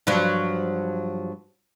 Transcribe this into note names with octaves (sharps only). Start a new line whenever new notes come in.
G2 F3 F#3